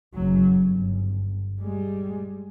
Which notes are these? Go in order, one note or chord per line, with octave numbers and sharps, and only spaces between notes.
F#1 F#3
G1
G3 G#3